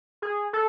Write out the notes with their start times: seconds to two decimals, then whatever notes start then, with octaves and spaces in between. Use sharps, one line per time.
0.22 G#4
0.53 A4